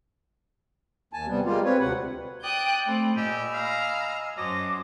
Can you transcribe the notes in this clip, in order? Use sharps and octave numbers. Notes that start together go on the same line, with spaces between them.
D#2 G#5 A5
C3 G3 B3
G3 G#3 A#3 F4 G4
C4 B4 C#5
D2 C3 F#5
D5 G5 D#6 F#6 G6
A3 C4 B5
A#2 G4 D#5 G#5 E6
F5 A#5 F6
F#2 F#4 C5 C#5 D#5 A5 D6